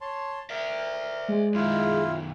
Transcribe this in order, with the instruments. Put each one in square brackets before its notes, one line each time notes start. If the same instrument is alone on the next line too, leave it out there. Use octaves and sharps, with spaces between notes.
[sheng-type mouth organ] C#5 A5 C6
[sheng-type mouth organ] A#4 [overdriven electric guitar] D5 E5
[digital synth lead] G#3
[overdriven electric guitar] F#2 D#3 [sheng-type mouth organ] E4 F4